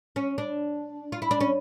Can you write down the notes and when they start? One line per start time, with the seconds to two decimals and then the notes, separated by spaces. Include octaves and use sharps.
0.16 C#4
0.38 D4
1.12 F4
1.22 E4
1.31 D4
1.40 C#4